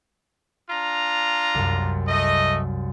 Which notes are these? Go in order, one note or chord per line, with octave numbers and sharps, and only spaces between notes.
D4 F4 A#5
C2 F#2
A3 D#5